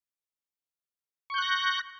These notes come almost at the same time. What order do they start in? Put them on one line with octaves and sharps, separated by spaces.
C#6 G6 F#6 A#6